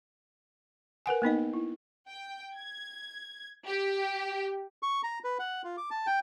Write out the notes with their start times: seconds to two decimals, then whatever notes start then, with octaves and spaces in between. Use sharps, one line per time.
1.06 A#4 B4 F#5 G#5
1.22 A#3 B3 D#4 D#5
1.54 E4
2.08 G5
2.56 G#6
3.66 G4
4.83 C#6
5.03 A#5
5.24 B4
5.39 F#5
5.64 F4
5.77 D6
5.91 A5
6.07 G5